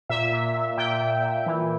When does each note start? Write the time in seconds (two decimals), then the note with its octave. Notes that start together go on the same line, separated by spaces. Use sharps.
0.09 A#2 E5
0.32 A#2
0.55 A#2
0.77 A#2 G5
1.00 A#2
1.24 A#2
1.46 E3